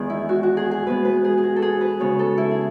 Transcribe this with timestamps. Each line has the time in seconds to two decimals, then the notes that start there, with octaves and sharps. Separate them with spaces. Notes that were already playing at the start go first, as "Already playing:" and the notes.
Already playing: E2 D#3 G#3 B3 G#4
0.10 E4
0.29 F#4
0.43 F#4
0.57 G#4
0.71 G#4
0.86 E2 B2 G#3 B3 B4
1.05 B4
1.24 G#4
1.38 G#4
1.43 F#4
1.56 A4
1.62 G#4
1.81 B4
2.00 C#3 G#3 B3 C#5
2.19 A4
2.38 E4
2.51 G#4